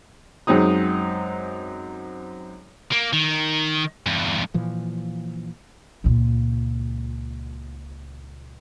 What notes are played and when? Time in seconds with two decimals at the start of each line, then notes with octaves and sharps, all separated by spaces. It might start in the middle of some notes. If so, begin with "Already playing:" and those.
0.47 F#2 G#3 C4 D#4 D#6
2.92 A#3
3.13 D#3
4.06 E2 G2
4.54 A#2 E3 F3
6.04 C#2 A#2